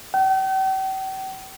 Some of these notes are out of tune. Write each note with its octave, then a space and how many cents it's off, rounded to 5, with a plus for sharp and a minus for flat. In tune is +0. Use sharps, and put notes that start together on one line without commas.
G5 -45